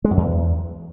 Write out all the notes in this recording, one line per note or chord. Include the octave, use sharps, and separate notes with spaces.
G#3
F#2
E2